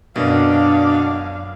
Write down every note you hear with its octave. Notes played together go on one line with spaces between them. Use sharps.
F#2 B2 D4 F5